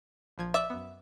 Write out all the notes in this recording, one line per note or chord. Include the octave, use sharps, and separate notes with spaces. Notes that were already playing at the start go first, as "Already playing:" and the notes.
A#1 F3 G#6
D5 E5 D6
F#2 B3